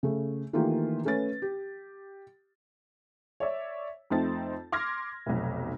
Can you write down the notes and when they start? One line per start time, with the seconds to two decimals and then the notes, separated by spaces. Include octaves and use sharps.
0.03 C#3 A3
0.53 D#3 E3 A3 A#3 F4 G4
1.05 A3 C#4 B4 A6
1.42 G4
3.40 C#5 D5 E5
4.10 F2 A3 C4 D#4 A6
4.72 C6 D6 F6 G#6 A#6
5.26 F1 B1